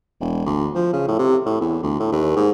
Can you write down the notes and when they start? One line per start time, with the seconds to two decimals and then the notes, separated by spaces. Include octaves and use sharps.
0.20 E1
0.46 D2
0.74 F3
0.93 C#3
1.07 A2
1.19 C3
1.46 A2
1.61 E2
1.83 D2
1.99 A2
2.12 D#2
2.36 G#2